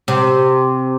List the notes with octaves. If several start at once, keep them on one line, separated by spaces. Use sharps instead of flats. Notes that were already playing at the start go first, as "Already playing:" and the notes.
C3